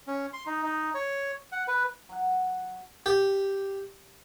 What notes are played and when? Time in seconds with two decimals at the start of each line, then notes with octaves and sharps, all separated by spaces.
0.07 C#4
0.33 C6
0.46 D#4
0.63 D#4
0.94 C#5
1.52 F#5
1.68 B4
2.09 F#3 F#5
3.06 G4